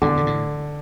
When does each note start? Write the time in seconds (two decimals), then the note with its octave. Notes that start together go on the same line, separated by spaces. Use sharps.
0.02 E2 G2 D3
0.17 A#2
0.26 A2